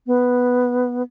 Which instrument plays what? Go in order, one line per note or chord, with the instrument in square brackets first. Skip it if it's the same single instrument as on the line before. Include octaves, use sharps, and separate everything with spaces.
[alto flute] B3